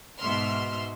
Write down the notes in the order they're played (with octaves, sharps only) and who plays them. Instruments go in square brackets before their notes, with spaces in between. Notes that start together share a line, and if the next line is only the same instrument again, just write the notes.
[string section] G#2 B2 E5 C6 F6